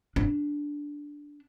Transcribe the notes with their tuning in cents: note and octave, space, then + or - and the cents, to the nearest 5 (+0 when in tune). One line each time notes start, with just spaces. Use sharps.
D4 -5